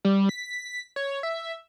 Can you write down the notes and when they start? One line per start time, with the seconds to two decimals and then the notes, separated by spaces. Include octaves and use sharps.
0.05 G3
0.29 B6
0.96 C#5
1.23 E5